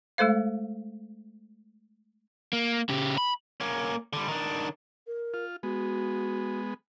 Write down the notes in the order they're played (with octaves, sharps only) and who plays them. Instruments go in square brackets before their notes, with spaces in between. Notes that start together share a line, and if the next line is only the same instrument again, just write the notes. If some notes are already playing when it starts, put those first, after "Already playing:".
[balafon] G#3 A3 A4 C5 F5
[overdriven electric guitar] A#3
C#3 G4
B5
A#3 C#4
D3 G3
D#3 D4
[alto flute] A#4
[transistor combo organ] F4
[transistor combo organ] G#3 B3 [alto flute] F#4